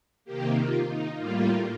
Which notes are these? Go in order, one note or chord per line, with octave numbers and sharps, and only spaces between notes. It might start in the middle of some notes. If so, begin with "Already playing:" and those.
C3 D#3 A#3 G4
F4
D#4
A2 G3 A#3 F4